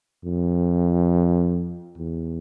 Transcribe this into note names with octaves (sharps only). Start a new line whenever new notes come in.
F2
E2